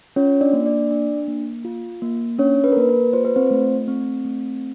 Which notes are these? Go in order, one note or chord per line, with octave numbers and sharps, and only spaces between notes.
C#4 F4 C#5
D4 D5
A#3
D4 D5
D4
A#3
F4
A#3
C#4 D4 C#5
B4
A#4
A#3 B4
B4
F4 C5
B4
C4 C5
A3
C4
A3